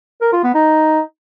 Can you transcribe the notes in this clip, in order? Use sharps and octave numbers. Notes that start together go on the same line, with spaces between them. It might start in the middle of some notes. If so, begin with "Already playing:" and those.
A#4
F4
B3
D#4